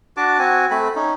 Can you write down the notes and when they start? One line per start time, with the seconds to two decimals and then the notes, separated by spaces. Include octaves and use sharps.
0.17 D4 F#4 A5 D6
0.39 C4 F#4 G#5
0.71 A3 C4 B5
0.95 C#4 D#4